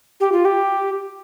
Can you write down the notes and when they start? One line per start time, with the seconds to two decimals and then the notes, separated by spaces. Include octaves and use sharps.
0.20 G4
0.32 F4
0.45 G4